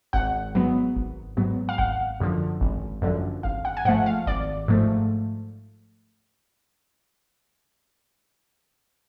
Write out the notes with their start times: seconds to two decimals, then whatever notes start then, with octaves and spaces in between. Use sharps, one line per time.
0.13 G#1 F#5
0.55 G#2 F#3 B3
0.96 G#1
1.37 G#2 F#3 B3
1.69 F5
1.78 G#1 F#5
2.20 F#2 D3 F3
2.61 G#1
3.02 F#2 D3 F3
3.43 G#1 F5
3.65 F#5
3.77 G#5
3.85 G#2 F3 A3 F#5
4.06 F5
4.27 G#1 D5
4.68 G#2 F3 A3